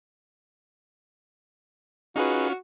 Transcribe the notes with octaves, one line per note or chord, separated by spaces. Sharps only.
C#4 D#4 F4 F#4 G#4 B4